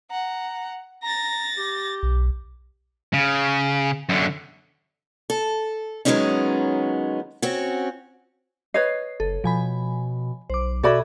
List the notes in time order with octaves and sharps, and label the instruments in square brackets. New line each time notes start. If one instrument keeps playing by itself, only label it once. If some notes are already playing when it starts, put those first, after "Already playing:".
[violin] F#5 [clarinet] A#5
[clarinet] A#5 [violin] A6 A#6
[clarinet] G4
[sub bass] B1
[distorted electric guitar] C#3
F#2 D3
[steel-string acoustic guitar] A4
D#3 F#3 G#3 B3 C#4 D#4
C4 C#4 F#4
[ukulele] B4 C#5 D#5 [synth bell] C7
[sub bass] F#1 [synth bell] A4
[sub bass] B2 [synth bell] F3 G#5 B5
[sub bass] B1 [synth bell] C5 D6
[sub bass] B2 [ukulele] F#4 D5 B5 [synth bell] A4 E5 G#6